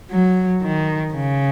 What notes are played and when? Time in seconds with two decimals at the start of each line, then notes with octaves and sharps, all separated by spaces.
0.11 F#3
0.63 D#3
1.14 C#3